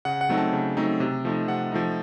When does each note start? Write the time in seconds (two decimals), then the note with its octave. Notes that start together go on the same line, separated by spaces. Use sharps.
0.05 C#3 F#5
0.21 F#5
0.29 F#3 A3 C4 D#4
0.37 A5
0.53 C#3
0.77 F#3 A3 C4 D#4
1.00 C3
1.25 F3 A3 D#4
1.48 C3 F#5
1.72 F3 A3 D#4